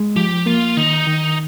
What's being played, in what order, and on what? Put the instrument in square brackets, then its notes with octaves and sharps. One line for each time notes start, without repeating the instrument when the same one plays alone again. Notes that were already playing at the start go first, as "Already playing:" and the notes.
Already playing: [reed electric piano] G#3
[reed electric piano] F3 [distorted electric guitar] G4
[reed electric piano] A#3 [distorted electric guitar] F4
[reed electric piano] D#3 [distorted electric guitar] D#4
[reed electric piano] D#3